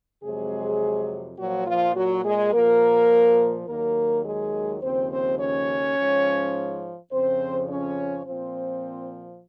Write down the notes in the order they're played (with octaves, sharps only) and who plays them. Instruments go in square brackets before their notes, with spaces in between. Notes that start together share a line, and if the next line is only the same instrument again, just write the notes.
[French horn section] F2 C3 F#3 G#3 G#4
A#2 F3 F#3 F#4
F3 F4
F#3 F#4
G#3 G#4
A#2 F3 A#3 A#4
D#2 D#3 F#3 A#3 A#4
G#3 G#4
D#2 C#3 F3 C4 C5
C4 C5
C#4 C#5
G#2 F3
F2 C#3 F3 C4 C5
C#4 C#5
A#2 F3 C4 C5